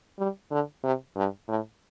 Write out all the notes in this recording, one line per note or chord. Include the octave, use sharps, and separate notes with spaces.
G3
D3
C3
G2
A2